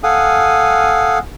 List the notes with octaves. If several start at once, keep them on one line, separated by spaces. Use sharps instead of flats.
A4 F5 F#5 G#5 D#6